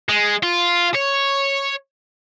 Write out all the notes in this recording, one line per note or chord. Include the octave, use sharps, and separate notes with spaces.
G#3
F4
C#5